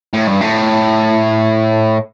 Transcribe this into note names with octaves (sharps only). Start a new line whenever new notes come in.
A2
G2
A2